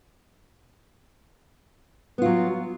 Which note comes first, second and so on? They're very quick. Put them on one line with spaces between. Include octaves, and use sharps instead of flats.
B3 F4 F#3